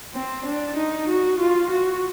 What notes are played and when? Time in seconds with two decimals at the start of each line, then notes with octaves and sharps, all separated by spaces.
0.14 C4
0.45 D4
0.77 D#4
1.08 F#4
1.40 F4
1.71 F#4